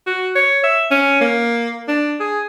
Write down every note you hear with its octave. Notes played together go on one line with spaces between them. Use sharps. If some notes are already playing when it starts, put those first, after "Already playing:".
F#4
C#5
E5
C#4
A#3
D4
G#4